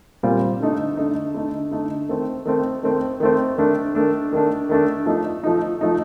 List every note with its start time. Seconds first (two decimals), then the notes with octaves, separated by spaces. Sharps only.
0.23 A#2 G3 C4 F4
0.60 D3 A3 D#4
0.97 D3 A3 D#4
1.34 D3 A3 D#4
1.71 D3 A3 D#4
2.09 D#3 A3 C4
2.45 D#3 A3 C4
2.83 D#3 A3 C4
3.20 D#3 A3 C4
3.58 D#3 A3 D4
3.95 D#3 A3 D4
4.33 D#3 A3 D4
4.69 D#3 A3 D4
5.06 F3 A3 D#4
5.43 F3 A3 D#4
5.81 F3 A3 D#4